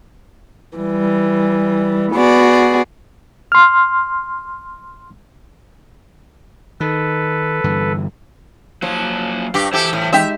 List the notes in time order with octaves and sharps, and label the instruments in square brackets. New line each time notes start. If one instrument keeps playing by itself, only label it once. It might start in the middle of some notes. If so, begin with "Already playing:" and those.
[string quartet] E3 G3
B3 F#4 G#4 D5
[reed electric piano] C6 F6
[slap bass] D#3 [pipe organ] A4 B4
[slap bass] G2 D3 E3
[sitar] F3 [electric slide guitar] F#3 A#3 C#5
[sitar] G2 G4
[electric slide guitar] E3 C5 [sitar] E4 G4 A4
[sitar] A2
[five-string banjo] G#3 D#4 G4 [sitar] E5